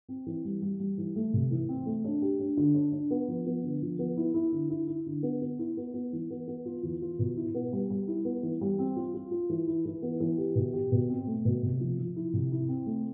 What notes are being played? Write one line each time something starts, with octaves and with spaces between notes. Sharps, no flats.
C4
E3
G3
G3
G3
E3
A3
C3
E3
C4
A3
D4
G4
D4
D3
D4
D4
B3
F3
B3
D3
F3
B3
E4
E4
D3
E4
E4
D3
B3
B3
E4
B3
B3
E3
B3
B3
F4
E2
F4
B2
E4
B3
G3
G3
E4
B3
E3
G3
C4
F4
F4
F4
E3
E4
E3
B3
E3
G4
B2
G4
B2
C4
A3
B2
C3
F3
F3
E4
C3
E4
C4
A3